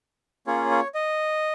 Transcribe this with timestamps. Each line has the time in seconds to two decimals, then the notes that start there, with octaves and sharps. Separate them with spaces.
0.47 A#3 C#4 F4 G#4 C#5
0.71 C#5
0.95 D#5